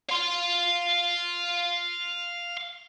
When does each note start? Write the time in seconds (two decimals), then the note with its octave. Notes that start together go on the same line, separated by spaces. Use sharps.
0.09 F5 C6